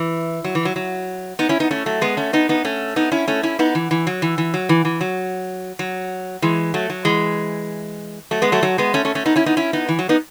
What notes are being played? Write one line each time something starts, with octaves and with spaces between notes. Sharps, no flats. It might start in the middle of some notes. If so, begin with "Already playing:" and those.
Already playing: E3
F#3
E3
F#3
F#3
B3 D#4
C#4 E4
B3 D#4
A3 C#4
F#3 A3
G#3 B3
A3 C#4
B3 D#4
B3 D#4
A3 C#4
B3 D#4
C#4 E4
A3 C#4
C#4 E4
B3 D#4
E3
E3
F#3
E3
E3
F#3
E3
E3
F#3
F#3
E3 G#3
F#3 A3
F#3
E3 G#3
F#3 A3
G#3 B3
F#3 A3
F#3
G#3 B3
A3 C#4
A3 C#4
A3 C#4
B3 D#4
C#4 E4
B3 D#4
C#4 E4
B3 D#4
E3
F#3
B3 D#4